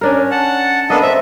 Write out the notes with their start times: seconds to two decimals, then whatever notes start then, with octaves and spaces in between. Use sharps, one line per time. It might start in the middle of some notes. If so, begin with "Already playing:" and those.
0.01 C#4 D4 A#4
0.31 F#5 A5
0.90 A#3 B3 D4 A4 D#5
1.02 C4 E5